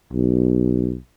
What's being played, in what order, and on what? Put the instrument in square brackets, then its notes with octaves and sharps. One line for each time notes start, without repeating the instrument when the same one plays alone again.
[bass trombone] B1